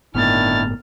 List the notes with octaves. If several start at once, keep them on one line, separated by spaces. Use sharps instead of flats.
G1 A2 D#3 B3 D4 E4 F6 A6